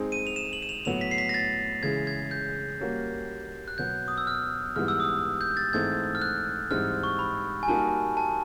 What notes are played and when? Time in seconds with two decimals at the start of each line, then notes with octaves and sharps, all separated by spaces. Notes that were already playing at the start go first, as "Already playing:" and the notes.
Already playing: G#3 C4 D#4 G#4
0.12 D#7
0.27 F7
0.36 E7
0.53 F#7
0.62 E7
0.69 F7
0.85 A2 F#3 B3 F7
1.01 B6
1.11 C7
1.18 B6
1.29 A#6
1.34 A6
1.83 C#3 E3 G#3 G#6
2.07 G#6
2.31 G6
2.81 G3 A#3 C#4 F#4 A#4
3.68 F#6
3.78 B2 F#3 B3 G6
4.08 D#6
4.18 E6
4.27 F6
4.76 G#2 E3 G3 B3 F6
4.88 E6
5.00 D#6
5.41 G6
5.57 A6
5.73 G#2 E3 A3 C4 D#4 G#6
6.15 F6
6.22 F#6
6.71 G#2 E3 G3 C4 D#4 F6
7.03 C#6
7.19 B5
7.63 G#5
7.68 G3 A#3 D#4 F#4 A#4 A5
8.17 A5